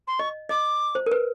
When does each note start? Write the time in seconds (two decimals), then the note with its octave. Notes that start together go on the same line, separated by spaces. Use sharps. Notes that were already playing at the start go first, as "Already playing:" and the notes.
0.07 C6
0.19 D#5 C#6
0.49 D#5 D6
0.95 C5
1.06 A#4
1.11 B4